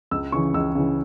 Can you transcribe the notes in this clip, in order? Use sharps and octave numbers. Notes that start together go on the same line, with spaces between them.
C#2 E6
C#3 E3 C#6
C#2 E6
C#3 E3